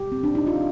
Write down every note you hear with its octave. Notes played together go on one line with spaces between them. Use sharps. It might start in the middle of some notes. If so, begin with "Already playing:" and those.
Already playing: B2 G#3 G4
C4
D4
D#4
F4